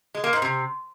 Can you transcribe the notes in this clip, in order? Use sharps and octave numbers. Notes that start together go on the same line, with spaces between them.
G#3
A#3
G#2
C3